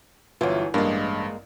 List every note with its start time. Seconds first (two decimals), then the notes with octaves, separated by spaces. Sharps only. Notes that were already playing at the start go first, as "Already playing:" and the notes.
0.41 G1 E3 F#3 F4 E5
0.74 A1 G2 G#3 A#3